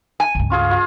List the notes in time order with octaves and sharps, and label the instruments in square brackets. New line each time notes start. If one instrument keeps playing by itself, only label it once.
[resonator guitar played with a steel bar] G#5
[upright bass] C#2 G2
[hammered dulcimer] C#4 F4 G#4
F4